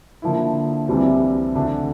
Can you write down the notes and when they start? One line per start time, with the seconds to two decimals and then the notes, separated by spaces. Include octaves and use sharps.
0.22 D3 F3 A#3 E4
0.88 C2 C3 E3 G3 C4
1.55 D2 D3 A3 D4